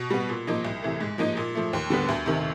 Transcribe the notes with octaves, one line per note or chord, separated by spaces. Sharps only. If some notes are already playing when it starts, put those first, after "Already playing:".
Already playing: B2
G3 B3
A#2
F3 A#3 D#4
C2
C3 E3 A3
G#2
F3 A#3 D#4
A#2
F3 A3
D#2
D3 G3 B3
D2
C3 D#3